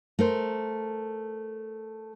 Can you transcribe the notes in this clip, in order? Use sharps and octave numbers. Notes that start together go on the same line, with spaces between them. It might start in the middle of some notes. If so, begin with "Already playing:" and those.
A3 A#4 C5